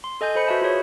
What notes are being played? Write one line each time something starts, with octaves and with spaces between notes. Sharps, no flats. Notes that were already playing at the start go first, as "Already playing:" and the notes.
C6
A4 D#5 G#5 G6
A4 C5 B5 C#7
F#4 B4 E5 A5 B5
F4 G#4 C#5